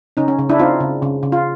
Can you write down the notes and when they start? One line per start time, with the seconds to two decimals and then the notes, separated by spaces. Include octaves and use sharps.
0.17 C#3 C#4 D#4
0.28 C#4
0.39 C#3
0.49 D4 E4
0.59 C4 D#4 F4
0.80 C#3
1.02 C#3
1.23 C#3
1.32 F4